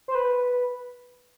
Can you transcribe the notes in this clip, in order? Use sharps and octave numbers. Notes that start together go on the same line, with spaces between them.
C5
B4